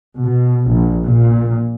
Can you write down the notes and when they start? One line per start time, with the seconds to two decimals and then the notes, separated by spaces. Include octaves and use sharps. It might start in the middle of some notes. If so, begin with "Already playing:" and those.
0.21 B2
0.70 A#1
1.04 A#2